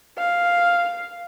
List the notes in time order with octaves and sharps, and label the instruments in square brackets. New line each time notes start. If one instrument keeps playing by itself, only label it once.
[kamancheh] F5